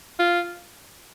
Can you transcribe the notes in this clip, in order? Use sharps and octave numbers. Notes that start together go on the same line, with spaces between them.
F4